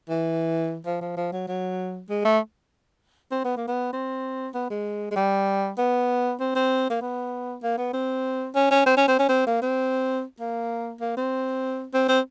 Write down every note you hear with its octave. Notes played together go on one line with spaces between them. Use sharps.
E3
F3
F3
F3
F#3
F#3
G#3
A3
C4
B3
A#3
B3
C4
B3
G#3
G#3
G3
B3
C4
C4
A#3
B3
A#3
B3
C4
C#4
C#4
C4
C#4
C4
C#4
C4
A#3
C4
A#3
A#3
C4
C4
C4